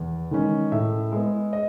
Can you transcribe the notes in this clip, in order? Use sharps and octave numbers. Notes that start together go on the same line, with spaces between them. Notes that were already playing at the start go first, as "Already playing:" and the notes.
Already playing: E2
D#3 G#3 C#4
A2 E5
G#3 B3
D#5